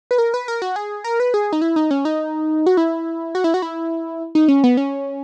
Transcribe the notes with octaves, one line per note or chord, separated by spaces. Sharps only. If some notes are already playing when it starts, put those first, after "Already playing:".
B4
A#4
B4
A#4
F#4
G#4
A#4
B4
G#4
D#4
E4
D#4
C#4
D#4
F#4
E4
F#4
E4
F#4
E4
D#4
C#4
B3
C#4